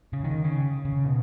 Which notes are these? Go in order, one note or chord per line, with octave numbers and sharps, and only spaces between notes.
C#3
D#3
C#3
C#3
B2